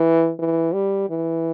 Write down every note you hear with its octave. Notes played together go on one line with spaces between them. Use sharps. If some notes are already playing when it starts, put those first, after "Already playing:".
Already playing: E3
E3
G3
E3